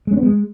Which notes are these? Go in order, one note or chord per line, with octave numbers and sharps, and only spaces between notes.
G#3
C#4
B3
G#3